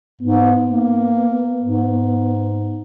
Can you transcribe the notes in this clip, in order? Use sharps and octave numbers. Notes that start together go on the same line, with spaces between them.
G#2 B3
A#3
G#2